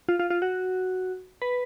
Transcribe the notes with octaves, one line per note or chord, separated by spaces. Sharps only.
F4
F4
F4
F#4
B4